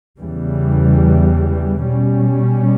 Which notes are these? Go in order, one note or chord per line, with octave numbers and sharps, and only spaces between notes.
E2 C#3 E3 G3
B2 G3 C#4